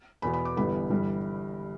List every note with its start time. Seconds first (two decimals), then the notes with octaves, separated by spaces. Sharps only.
0.22 E2 B2 B3 B5
0.34 B5
0.45 D6
0.56 G1 G2 E3 G3 B3 B5
0.90 G1 G2 E3 G3